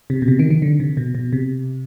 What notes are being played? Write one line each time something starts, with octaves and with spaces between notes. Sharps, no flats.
C3
B2
C3
D#3
D#3
D3
C3
B2
B2
C3